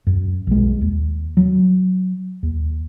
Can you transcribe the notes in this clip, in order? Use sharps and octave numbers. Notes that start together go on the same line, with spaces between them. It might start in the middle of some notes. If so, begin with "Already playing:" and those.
F#2
B1 G#3
D#2
F#3
D#2